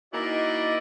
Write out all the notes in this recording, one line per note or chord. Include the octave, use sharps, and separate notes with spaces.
A#3 D#4 E4 F#4 D5 D#5